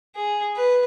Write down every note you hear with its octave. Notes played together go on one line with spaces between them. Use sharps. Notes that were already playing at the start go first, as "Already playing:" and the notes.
G#4
B4